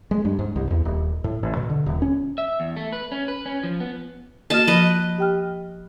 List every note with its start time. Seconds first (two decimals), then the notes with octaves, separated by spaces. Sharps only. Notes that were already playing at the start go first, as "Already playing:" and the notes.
0.11 G#3
0.25 G2
0.39 G#2
0.56 C2
0.71 E2
0.85 D#1
1.24 A2
1.43 A1
1.57 B2
1.70 D3
1.86 D#1
2.02 C#4
2.38 E5
2.60 E2
2.77 A3
2.93 B4
3.12 C#4
3.28 B4
3.46 C#4
3.63 F3
3.80 B3
4.50 A#3 F#4 D#5 A5 F6
4.67 F3 B4 D#5
5.18 G4 G5 F6